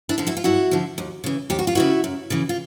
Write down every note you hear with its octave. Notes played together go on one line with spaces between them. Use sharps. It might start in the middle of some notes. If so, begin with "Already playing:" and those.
D4 E4
D3 F3
E4 F#4
F4
G2 E4 F#4
D3 F3
D#2
C#3 E3
D#2 G4
F#4
F4
C#3 E3 E4 F#4
F#2
C#3 E3
F4